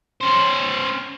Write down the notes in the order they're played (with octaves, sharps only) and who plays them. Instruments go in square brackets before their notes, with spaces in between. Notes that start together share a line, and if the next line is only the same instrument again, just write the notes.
[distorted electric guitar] C#4 C5